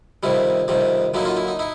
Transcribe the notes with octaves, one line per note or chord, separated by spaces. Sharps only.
F2 C3 D#3 G3 E4
F2 C3 D#3 G3
D3 F#3 A#3 D#4 E4
D#4 F4
E4
D#4
D#4 E4